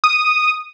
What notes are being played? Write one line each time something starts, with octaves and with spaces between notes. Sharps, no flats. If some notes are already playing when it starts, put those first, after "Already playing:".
D#6